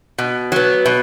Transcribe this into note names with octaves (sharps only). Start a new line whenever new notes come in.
B2
F#3 B3
B2